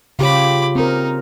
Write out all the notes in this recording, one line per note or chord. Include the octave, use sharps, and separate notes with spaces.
C#3 F4 G4 C#5 G5 B5 D6
C4 D#4 A#4